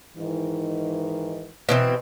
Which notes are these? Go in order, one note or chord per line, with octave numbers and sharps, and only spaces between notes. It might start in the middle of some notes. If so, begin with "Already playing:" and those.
G#2 D#3 E3
B2 E3 C4